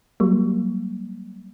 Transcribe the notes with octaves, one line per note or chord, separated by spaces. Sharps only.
F#3 G3 A#3